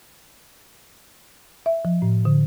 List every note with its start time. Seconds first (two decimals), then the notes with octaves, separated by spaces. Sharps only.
1.66 E5
1.85 F3
2.02 A2
2.25 D3